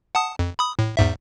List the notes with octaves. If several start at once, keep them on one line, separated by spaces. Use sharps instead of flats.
F#5 A5 D#6
F2
B5 D#6
A2
E2 G#2 E5